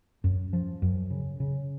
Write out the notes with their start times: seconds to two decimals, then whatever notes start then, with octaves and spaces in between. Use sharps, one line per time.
0.24 F#2
0.53 F3
0.82 F#2
1.10 C#3
1.40 C#3